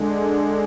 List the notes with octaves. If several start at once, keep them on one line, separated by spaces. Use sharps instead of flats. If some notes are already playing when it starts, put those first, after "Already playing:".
Already playing: D3 G#3